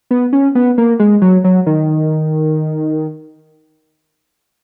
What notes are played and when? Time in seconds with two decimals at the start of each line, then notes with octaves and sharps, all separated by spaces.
0.11 B3
0.33 C#4
0.55 B3
0.78 A#3
0.99 G#3
1.22 F#3
1.44 F#3
1.66 D#3